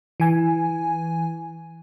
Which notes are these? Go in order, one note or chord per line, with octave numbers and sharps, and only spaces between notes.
E3 G#5